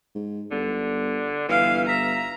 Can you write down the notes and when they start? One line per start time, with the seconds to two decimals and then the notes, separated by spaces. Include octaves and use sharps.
0.15 G#2
0.51 G1 D3
1.49 G1 E3 F5
1.89 E5 A#5